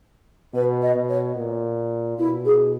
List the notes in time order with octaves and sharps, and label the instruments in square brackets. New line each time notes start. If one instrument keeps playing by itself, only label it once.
[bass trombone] B2 [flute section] B4
[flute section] D#5
[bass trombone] B2
[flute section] C#5
[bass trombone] A#2
[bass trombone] B2 [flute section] E4
[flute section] G#4